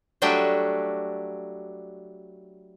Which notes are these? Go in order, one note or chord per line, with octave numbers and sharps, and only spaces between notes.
F#3 G3 A3 D4 F#4 G4